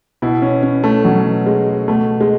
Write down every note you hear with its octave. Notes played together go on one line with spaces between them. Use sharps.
B2 E4
C#4
C#4
A3
B2 F#3
G#3
B2 A3
G#3